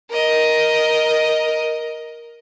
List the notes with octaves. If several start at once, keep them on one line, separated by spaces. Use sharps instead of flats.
A#4 D#5